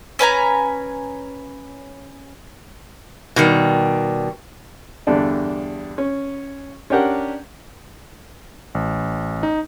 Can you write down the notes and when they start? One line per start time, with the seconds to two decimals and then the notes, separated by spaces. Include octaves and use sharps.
0.19 C#4 B4 G#5 A#5
3.36 B2 D#3 G3
5.07 E2 G2 D3 D4
5.98 C#4
6.90 C#4 D4 G4 A#4 F#5
8.75 A1
9.43 D#4